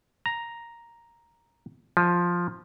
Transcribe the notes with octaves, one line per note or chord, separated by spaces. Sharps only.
A#5
F3